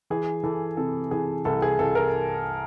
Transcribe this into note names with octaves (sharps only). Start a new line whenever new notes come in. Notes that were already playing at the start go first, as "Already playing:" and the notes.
E3 G#4
E3 A4
C3 A4
E3 G#4
C2 A4
G#4
C2 A4
A#4